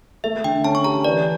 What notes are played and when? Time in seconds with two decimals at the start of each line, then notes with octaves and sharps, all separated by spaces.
0.24 A3 E5
0.44 D3 G5
0.64 C#4 A5
0.75 C#6
0.84 G4 A#5
1.04 E3 D5